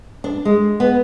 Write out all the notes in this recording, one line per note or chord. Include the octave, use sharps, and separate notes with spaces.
D4
G#3
B3